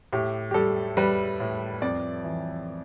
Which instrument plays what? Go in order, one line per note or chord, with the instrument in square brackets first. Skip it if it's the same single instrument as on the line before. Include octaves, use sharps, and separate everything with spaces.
[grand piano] A2 G4
G4
G3 A4
G3 B4
A2
F2 D5
E3